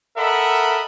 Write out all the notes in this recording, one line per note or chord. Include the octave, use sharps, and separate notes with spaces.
A4 A#4 D#5 E5 F#5 B5